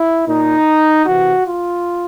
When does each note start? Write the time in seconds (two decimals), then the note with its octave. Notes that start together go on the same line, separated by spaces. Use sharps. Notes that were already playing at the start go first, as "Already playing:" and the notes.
Already playing: E4
0.27 A#2 D#4
1.06 C3 E3 F#4
1.45 F4